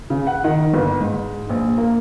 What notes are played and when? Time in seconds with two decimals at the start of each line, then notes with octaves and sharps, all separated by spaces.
0.10 C#3
0.27 F#5
0.44 D#3
0.74 G1
1.00 G#2
1.49 A#1
1.78 A#3